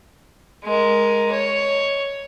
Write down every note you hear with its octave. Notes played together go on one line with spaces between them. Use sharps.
G#3 A#4
C#5